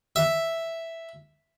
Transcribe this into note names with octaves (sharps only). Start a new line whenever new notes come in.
E5